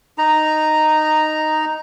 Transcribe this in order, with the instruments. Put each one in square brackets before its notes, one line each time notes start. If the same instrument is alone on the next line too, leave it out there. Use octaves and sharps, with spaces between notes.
[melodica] D#4 A#5